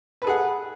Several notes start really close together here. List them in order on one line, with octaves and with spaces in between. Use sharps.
B4 A4 G#4 F#5